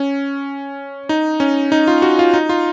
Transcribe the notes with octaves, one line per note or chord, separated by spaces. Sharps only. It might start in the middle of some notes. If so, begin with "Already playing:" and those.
Already playing: C#4
D#4
C#4
D#4
F4
F#4
F4
D#4
F4